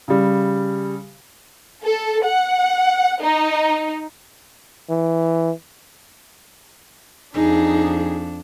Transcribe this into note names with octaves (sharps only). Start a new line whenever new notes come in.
C#3 G3
A4
F#5
D#4
E3
F2 D4 D#4 G#4